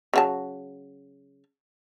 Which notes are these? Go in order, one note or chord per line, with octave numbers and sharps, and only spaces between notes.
C#3 F#3 A5